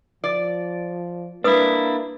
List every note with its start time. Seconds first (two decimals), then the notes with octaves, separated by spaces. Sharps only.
0.24 F3 D5
1.44 A#3 D4 E4 B4 D#6